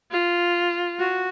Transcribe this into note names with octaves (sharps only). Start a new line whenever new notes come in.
F4
F#4